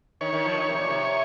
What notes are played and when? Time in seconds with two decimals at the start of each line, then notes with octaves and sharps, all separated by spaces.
0.21 D#3 C#5
0.33 D#3
0.45 F3
0.57 D#3
0.70 C3
0.78 A#2
0.89 C3